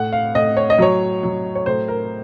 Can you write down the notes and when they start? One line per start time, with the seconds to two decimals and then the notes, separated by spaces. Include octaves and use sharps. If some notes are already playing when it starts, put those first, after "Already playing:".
Already playing: A2 F#5
0.13 F5
0.35 A2 D#5
0.57 C#5
0.70 D#5
0.78 F#3 C#5
1.23 F#3
1.55 C#5
1.66 A2 C5
1.88 A#4